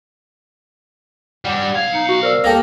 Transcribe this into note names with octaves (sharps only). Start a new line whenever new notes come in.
G3 D4 F#5 D6
B1 F5 G#6
D#4 C#7
F#4
A#4 C5 D5 E6
A#3 G4 A4 A#6